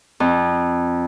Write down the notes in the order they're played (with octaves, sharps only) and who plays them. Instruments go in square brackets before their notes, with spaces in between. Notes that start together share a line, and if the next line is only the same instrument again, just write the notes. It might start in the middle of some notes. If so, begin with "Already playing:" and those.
[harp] F2